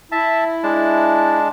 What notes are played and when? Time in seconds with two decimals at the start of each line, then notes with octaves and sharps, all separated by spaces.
0.12 E4 E5 A5
0.63 G#3 D4 A5